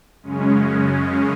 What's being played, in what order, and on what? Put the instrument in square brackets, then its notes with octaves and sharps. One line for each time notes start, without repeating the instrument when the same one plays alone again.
[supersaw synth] F#2 C#3 G#3 C#4